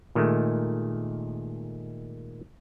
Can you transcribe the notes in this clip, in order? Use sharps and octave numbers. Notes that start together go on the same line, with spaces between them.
A#2 D#3 G#3 A3